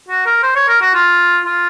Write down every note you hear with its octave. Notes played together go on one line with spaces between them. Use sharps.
F#4
A#4
C5
C#5
A#4
F#4
F4
F4